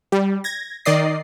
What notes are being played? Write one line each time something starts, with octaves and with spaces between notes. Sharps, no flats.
G3
G#6 A#6
D#3 D5 D#5 C7